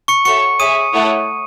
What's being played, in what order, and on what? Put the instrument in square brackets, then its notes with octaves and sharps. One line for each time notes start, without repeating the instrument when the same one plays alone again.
[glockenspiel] C#6 C#7
[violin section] F#4 A4 C#5 E5 [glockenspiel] C#6 C#7
[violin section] G#4 C#5 E5 [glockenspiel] D#6 D#7
[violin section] A3 E4 A4 C#5 F#5